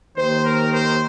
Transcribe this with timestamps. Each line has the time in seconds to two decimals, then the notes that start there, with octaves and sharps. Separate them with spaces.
0.16 D#2 D#3 C5
0.45 A#4
0.74 C5